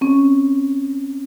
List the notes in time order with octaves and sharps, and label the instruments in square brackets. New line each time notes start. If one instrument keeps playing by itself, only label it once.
[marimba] C4 C#4